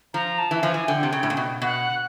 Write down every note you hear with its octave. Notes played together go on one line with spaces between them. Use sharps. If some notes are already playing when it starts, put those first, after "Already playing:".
F3 A#5
A5
E3
F3 G#5
E3
D3 G5
C3
C#3
A2
A#2
B2
B2 F#5